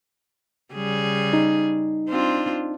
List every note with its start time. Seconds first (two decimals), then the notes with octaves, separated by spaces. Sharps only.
0.74 C#3 G3 G#4
1.33 D#4
2.09 C4 D4 F4